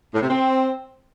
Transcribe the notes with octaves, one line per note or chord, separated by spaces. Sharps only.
A2
C3
C4